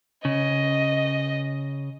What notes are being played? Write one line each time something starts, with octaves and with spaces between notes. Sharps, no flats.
C#3 D#5